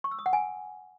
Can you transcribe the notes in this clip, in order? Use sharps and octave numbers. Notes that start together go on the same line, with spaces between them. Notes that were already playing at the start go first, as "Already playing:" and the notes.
C#6
E6
D#6
F#5
G#5